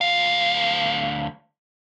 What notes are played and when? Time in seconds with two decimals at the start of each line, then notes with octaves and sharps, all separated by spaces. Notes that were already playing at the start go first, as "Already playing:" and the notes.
0.01 D2 F5